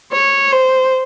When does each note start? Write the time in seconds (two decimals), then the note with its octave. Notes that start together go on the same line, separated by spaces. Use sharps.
0.13 C#5
0.52 C5